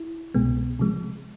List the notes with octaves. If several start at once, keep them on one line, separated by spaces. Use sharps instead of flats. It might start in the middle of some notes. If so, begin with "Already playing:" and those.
Already playing: E4
C2 B2 G#3 B3
C3 F3 G#3